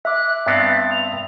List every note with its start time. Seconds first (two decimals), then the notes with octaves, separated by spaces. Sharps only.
0.05 E5 D6 F#6
0.47 G2 B3 C4 E5 A6
0.90 F7